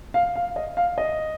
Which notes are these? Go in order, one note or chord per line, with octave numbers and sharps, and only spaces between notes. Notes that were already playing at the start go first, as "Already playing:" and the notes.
F5
F5
D#5
F5
D#5